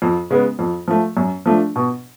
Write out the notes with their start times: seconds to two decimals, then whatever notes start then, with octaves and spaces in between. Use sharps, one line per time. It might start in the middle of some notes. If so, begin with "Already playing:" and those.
0.02 F2
0.30 C#3 G#3 B3
0.59 F2
0.88 F3 A3
1.17 F#2
1.46 F3 A3 D4
1.76 B2